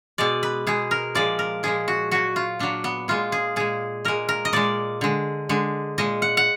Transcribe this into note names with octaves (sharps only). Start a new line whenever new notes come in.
B2 G#3 D5
B4
B2 G#3 G#4
A#4
A#2 F3 G#3 D5
A#4
A#2 F3 G#3 G#4
F#4
A#2 F#3 F#4
F4
A#2 F#3 D4
B3
A#2 G#3 F4
G#4
A#2 G#3 G#4
A#2 G#3 A#4
A#4
D#5
A#2 G#3 D5
D3 G#3
D3 G#3
A#2 G#3 D#5
F#5
F#5